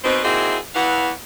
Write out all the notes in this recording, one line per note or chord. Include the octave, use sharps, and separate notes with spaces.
B2 C4 D#4
A#3 C4 D#4 E4 F#4 G#4
E2 E3 F5 F#5